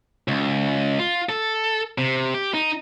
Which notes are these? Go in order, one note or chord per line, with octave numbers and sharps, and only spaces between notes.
C#2
F4
A4
C3
G4
D#4